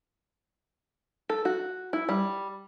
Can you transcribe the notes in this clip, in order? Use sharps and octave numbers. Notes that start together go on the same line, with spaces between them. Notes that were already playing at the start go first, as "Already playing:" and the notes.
A4
F#4
E4
G3